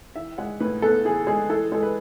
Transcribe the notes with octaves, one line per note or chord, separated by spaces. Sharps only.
E3 E5
G#3 F#5
A2 B4
B3 A4
E3 G#4
G#3 G#4
E3 A4
G#3 A4
B4